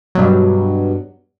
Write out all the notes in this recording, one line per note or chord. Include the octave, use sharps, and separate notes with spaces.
G2 B2 F#3